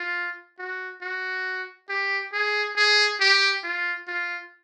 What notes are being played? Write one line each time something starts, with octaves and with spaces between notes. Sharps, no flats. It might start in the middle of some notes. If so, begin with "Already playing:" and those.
Already playing: F4
F#4
F#4
G4
G#4
G#4
G4
F4
F4